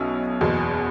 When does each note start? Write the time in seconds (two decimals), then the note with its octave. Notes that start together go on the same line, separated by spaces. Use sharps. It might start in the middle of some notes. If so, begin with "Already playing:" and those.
Already playing: B1 B2 C#4 E4
0.41 F#1 E2 B2